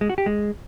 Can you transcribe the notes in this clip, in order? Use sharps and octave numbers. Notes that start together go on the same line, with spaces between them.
G#3
F#4
G4
G#3